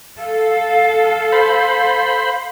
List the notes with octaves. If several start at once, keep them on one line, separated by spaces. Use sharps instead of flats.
A4 F5
C5 B5